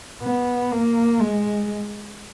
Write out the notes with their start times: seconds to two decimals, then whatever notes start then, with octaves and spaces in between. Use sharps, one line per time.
0.22 B3
0.71 A#3
1.20 G#3